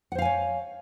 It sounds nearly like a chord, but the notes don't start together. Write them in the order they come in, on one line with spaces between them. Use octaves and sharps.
F#5 C5 F5 G#5 C#5